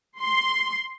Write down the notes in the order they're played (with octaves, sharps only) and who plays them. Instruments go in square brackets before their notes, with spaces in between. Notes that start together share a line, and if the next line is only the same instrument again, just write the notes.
[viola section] C6